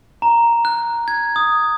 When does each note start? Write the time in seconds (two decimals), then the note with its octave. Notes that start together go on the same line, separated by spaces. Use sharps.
0.22 A#5
0.65 F#6
1.08 G#6
1.36 D#6